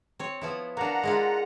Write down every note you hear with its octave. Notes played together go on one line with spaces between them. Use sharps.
C4 C#5
F3 B3 E4
A#3 D4 F#5 A#5
G#3 E4 F4